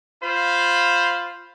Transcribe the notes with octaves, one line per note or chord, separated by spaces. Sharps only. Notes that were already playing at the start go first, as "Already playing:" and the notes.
F4 C5 F5 B5